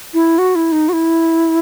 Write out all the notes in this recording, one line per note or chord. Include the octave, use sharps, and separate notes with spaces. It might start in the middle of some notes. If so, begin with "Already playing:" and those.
E4
F#4
E4
D#4
F#4
E4